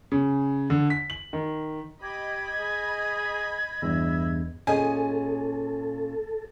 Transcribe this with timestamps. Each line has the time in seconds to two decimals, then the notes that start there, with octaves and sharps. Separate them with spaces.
0.12 C#3
0.70 D3
0.90 B6
1.10 F#7
1.33 D#3
2.02 G4 D#5 B5 G#6
2.59 G#4
3.82 E2 G2 E5
4.67 A#2 C#4 G#4 A4 D#5 G#5